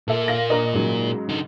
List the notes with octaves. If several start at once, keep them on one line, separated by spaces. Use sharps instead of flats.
A#2 A#3 A4 E5
F5 A#6
D4 A#4 D#5
G#2 C#3 F#3
D3 D#4